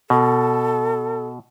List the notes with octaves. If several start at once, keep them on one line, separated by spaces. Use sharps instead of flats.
B2 A4